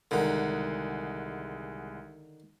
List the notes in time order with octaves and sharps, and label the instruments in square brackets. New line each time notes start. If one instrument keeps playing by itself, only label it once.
[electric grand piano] C2 G#3 F#5 [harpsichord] D3 D#3